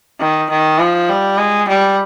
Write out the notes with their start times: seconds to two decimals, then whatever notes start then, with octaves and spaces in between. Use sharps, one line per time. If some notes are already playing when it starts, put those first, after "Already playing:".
0.20 D#3
0.50 D#3
0.79 F3
1.09 G3
1.37 G#3
1.68 G3